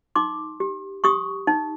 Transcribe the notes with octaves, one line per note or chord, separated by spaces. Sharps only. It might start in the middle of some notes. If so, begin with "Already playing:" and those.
D#4 C6 D6
G4
G4 C#6 D#6
D#4